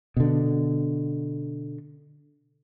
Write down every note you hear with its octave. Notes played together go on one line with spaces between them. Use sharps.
B2 D3